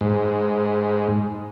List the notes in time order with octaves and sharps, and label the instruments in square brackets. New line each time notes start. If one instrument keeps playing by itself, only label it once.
[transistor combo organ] G#2